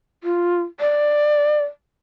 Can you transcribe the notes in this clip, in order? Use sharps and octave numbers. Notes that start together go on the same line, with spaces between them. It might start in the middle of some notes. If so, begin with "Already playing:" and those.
F4
D5